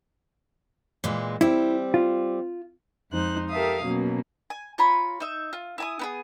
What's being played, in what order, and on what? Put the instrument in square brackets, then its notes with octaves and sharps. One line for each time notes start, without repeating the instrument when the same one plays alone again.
[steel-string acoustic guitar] A#2 E3 G#3
[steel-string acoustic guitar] G3 C4 [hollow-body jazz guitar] E4
[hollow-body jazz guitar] F4
[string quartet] F2 F3 G#3 D#4 C5 F#6
G4 A4 A#4 E5 F5 D#6
B2 F#3 A#3 C#4
[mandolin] G#5
F4 C#5 A#5 B5
D#4 E5
F4
E4 G#5 D#6
B3 E4 G#4